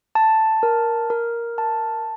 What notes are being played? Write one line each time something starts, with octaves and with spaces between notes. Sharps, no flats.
A5
A#4
A#4
A5